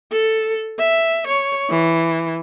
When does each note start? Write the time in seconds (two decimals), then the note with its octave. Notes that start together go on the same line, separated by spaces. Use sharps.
0.12 A4
0.79 E5
1.27 C#5
1.70 E3